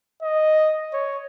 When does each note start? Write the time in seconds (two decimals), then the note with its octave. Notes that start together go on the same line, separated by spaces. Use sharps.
0.23 D#5
0.94 C#5